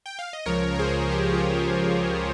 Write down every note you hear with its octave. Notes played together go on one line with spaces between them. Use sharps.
G5
F5
D#5
C#2 C#3 F3 A#4 C#5
A#4
G#4 C5
G4 A#4
F4 G#4
G4